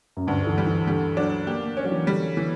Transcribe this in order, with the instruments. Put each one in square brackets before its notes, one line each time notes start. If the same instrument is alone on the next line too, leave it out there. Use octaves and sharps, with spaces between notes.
[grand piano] F#2
[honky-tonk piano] D2 [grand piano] G2
[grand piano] D3
E3
[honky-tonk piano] G3
[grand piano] E3
[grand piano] D3 [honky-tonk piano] G3
[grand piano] F#3 [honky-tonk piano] D4
[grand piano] A#3 [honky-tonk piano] G4
[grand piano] A#3
[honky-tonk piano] C#4
[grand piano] F#3
E3
[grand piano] D3 [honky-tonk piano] G3
[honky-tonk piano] E3